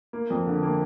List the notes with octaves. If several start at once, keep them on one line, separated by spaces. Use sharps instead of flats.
A#3
F2
D3
A#3